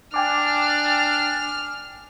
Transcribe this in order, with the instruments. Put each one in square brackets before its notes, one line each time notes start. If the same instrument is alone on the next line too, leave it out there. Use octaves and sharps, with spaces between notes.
[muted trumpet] D4 [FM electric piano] G5 G#5 D6 [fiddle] F6